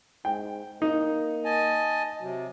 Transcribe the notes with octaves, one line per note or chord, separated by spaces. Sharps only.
G#2 G5
A#3 D#4
D#5 G#5 A5
C3 F#3